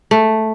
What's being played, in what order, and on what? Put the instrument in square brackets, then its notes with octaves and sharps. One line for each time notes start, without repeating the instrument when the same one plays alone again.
[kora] A3